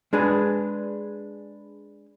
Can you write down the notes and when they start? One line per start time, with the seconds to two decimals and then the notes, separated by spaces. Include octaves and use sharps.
0.13 G#3 D4 G#4 B4